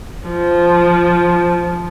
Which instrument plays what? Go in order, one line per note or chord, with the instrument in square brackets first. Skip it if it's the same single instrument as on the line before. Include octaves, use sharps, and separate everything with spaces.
[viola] F3